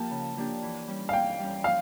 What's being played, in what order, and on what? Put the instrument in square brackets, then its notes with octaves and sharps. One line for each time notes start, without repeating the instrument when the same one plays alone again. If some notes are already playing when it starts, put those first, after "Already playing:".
Already playing: [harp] F3 A#3 G4 [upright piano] A5
[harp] C#3
F3 A#3 D4 G4
E3
G3 C#4
[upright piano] F5
[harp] E3 [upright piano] G5
[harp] G3 C#4
[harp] F3 [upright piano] F5